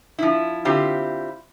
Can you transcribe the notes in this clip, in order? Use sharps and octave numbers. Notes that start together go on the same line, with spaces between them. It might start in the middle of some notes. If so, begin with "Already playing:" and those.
F3 E4
D3 C4 E4 F4 G4